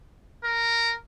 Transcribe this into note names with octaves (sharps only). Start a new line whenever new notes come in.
A#4